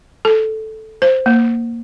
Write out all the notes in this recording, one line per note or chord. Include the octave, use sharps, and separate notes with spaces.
A4
C5
A#3